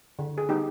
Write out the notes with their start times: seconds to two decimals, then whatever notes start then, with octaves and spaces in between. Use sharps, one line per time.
0.19 D3
0.38 G#4
0.49 G3 B3 D#4 G4